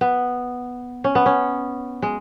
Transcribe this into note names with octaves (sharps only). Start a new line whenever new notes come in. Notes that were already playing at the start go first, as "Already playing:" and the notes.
B3
C#4
B3
C#4
G#3